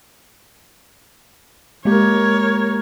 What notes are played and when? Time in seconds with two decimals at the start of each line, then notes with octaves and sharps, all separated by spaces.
1.85 G#3 A#3 G4 A#4 C#5